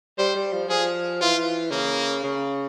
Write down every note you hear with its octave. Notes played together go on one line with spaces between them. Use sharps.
G3 C5
G3
F3
F3 G#4
E3 F4
C#3 A#3
C#3